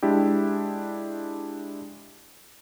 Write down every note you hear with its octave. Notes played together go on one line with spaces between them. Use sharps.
G#3 D4 E4 G4